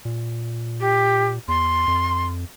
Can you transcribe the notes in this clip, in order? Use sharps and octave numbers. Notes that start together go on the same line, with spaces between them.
A#2
G4
E2 C6
F2